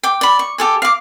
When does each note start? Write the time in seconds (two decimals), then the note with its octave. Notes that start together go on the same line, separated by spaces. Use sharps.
0.03 G5 D6
0.21 D5 B5
0.39 C#6
0.58 G4 A4 G#5
0.82 F5 D6